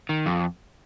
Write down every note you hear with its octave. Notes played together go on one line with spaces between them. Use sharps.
D#3
F2